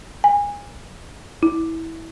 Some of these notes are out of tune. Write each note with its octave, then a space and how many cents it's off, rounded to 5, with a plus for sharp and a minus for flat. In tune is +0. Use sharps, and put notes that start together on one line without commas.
G#5 -25
E4 -15